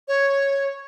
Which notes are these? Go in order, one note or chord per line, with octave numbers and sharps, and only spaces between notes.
C#5